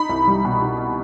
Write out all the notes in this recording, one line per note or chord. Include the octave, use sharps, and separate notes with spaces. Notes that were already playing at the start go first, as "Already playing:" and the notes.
Already playing: D#4 B5
C2
G3
B2
D#4